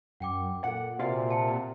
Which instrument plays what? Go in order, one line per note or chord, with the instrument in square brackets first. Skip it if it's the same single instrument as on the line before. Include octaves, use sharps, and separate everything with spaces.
[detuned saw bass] F#2 [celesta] F#5 G5 D6
[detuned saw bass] A#2 [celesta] A4 C#7 [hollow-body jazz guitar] F#5
[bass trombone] C3 [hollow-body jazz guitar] F4 D5 F5 [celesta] F#4 G#5
[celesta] F#5 A5 C#7